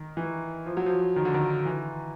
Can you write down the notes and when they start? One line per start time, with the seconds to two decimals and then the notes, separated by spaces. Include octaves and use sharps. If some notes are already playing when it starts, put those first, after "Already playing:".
Already playing: D#3
0.17 E3
0.66 F3
0.77 F#3
0.86 F3
1.16 D#3
1.25 D3
1.34 D#3
1.65 E3